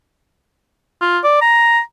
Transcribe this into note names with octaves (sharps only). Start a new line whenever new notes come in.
F4
D5
A#5